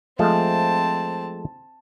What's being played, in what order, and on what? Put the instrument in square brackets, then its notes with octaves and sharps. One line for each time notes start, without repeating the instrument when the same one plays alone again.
[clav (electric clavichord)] F3 G#3 A3 [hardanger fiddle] C4 A5